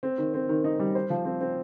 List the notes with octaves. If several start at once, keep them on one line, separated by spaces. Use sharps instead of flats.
C4
D#3
C4
D#3
D#4
G3
C5
F3
C4
C4